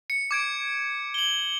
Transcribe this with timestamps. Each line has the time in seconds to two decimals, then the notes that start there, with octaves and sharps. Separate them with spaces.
0.10 C#7
0.31 D6 G#6 D7
1.14 F#7 G7